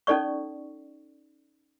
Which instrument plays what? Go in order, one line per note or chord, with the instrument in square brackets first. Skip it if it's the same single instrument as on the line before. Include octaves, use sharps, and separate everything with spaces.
[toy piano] C#4 D#4 A4 D5 C#6